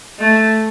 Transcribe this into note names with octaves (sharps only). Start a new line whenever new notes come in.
A3